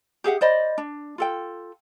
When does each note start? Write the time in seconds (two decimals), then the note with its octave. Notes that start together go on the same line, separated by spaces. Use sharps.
0.24 G4 G#4 E5 F#5
0.41 C5 D5 D#5 B5
0.78 D4
1.18 F4 A4 G5